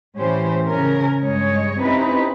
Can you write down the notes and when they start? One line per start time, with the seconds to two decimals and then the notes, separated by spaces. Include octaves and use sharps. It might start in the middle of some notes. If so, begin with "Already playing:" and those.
0.18 A2 E3 C#4 G4 C5
0.67 C#3 C#4 A#4
1.21 G2 G#3 C#5 D#5
1.80 C4 C#4 D#4 E4 G4 B4